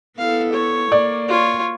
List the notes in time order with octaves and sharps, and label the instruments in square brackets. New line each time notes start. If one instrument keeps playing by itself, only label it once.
[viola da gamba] B3 E4 A4 [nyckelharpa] F5
[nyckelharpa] C#5
[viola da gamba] A#3 [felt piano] D5
[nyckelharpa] F4 C#5